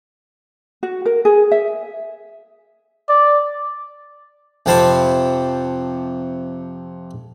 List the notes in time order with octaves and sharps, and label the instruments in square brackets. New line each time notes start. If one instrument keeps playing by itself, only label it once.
[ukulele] F#4
A#4
G#4
E5
[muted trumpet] D5
[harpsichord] F2 C3 C4 A5 B5